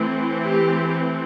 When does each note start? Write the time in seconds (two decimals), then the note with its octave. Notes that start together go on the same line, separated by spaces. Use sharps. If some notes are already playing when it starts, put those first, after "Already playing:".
Already playing: E3 A3 C4
0.45 G4